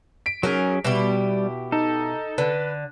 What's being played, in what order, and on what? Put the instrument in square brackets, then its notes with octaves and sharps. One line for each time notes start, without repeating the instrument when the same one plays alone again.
[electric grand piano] B6 D7
[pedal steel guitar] F#3 C#4 [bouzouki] D#4 G#4 A#4
[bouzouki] B2 E4 G4 [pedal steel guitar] G3
[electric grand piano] D#4 [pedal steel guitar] A4
[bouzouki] D3 [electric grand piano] B4